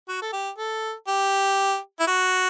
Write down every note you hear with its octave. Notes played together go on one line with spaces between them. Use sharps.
F#4
A4
G4
A4
G4
E4
F#4